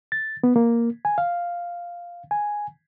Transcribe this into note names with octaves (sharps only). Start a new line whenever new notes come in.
A6
B3
A#3
G#5
F5
G#5